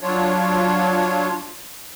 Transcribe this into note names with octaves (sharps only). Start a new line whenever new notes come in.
F#3 D4 F4 C#5